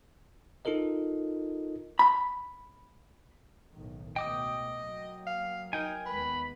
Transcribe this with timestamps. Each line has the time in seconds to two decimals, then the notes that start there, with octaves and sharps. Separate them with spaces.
0.65 D#4 F4 A4 A#4 D#5
1.99 B5
3.74 B1 A2 D#3
4.16 C#2 B2 A3 D#5 G5 D6 D#6
4.76 F#3 A#3
5.27 F5
5.73 D#4 A#4 G5 G#5
6.06 D#2 G#3 B3 B4 B5